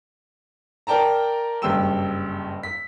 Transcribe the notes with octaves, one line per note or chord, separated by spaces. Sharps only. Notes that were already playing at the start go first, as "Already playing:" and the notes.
A#4 D5 G5 A5 A#5
F#1 G2 G4 G5 E6 E7
B6